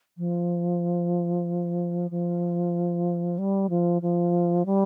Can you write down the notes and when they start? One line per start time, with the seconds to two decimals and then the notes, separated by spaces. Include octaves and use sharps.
0.18 F3
2.11 F3
3.38 G3
3.70 F3
4.02 F3
4.66 G3